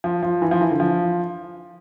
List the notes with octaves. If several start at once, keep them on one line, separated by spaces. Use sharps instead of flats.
F3
F3
E3
F3
E3
D3
F3